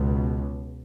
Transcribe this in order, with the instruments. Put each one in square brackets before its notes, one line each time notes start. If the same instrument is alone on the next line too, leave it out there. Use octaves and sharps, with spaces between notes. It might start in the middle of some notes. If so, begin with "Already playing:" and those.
Already playing: [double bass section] C#2 B2